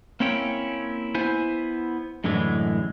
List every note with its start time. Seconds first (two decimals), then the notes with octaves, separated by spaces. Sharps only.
0.20 A#3 C4 C#4 E4 C#5 G5
1.15 B3 E4 C5 G#5
2.24 F#2 A2 D3 E3 G#3